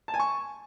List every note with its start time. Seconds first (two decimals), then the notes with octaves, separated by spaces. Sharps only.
0.08 A5
0.14 G#5
0.19 C#6